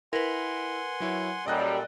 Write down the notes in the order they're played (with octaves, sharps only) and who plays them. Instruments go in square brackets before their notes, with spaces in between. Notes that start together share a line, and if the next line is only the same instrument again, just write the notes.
[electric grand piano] E4 [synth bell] A#4 B4 [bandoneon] F#5 G#5 C6
[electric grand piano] F#3 E4 C#5
[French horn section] F#2 G3 [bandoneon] A#2 A4 [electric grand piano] D5 D#5 F#6